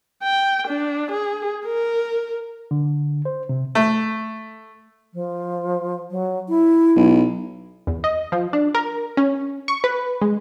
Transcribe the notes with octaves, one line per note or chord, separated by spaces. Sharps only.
G5
D4
G#4
A#4
D3
C5
C3
A3
F3
F#3
E4
B1
E2
D#5
F3
D4
A#4
C#4
C#6
B4
G#3